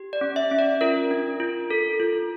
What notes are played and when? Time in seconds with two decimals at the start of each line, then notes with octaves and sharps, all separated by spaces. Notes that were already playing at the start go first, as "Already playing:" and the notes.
Already playing: G4
0.13 D5
0.21 C#4
0.36 E5
0.51 C#4
0.58 D5
0.81 F4 A#4
1.11 D4
1.40 F4
1.70 A4
2.00 F4